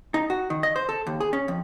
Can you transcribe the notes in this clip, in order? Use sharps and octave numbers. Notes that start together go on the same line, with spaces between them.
D#4
F#4
D#3
D#5
C5
A4
D#2
G#4
C#4
F2